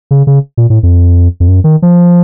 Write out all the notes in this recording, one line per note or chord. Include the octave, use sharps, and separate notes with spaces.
C#3
C#3
A#2
A2
F2
F2
F#2
D#3
F3